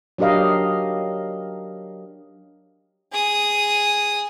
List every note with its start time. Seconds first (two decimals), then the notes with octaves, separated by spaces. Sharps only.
0.18 F#3 D4 G4 A#4 D#5 F5
3.12 G#4 D#6